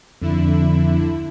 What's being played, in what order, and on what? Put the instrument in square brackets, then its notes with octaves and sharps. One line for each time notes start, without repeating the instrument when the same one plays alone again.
[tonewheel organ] F2 [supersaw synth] D3 E4